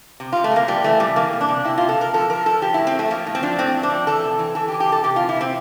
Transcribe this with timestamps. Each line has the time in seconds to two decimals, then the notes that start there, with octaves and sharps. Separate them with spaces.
0.20 C3
0.33 C3 F4
0.44 A3
0.52 C3 A#3
0.68 E3 G3
0.84 E3 A3
1.00 C3 G3
1.16 E3 A#3
1.33 C3
1.41 D4
1.49 C3
1.65 C3 E4
1.78 C3 F4
1.89 A4
1.97 C3 A#4
2.14 F3 A4
2.30 F3 A#4
2.46 F3 A4
2.62 F3 G4
2.74 A2 E4
2.87 C4
2.95 A2 A3
3.10 F3 A#3
3.27 A2
3.35 C4
3.42 F3 D4
3.59 A2 C4
3.74 A2
3.83 D4
3.91 F3
4.07 E3 A4
4.24 C3
4.39 E3
4.55 E3 A4
4.68 G4
4.72 E3
4.80 G4
4.88 C3 A4
5.04 C3 G4
5.16 E3 F4
5.29 E4
5.36 C3 C4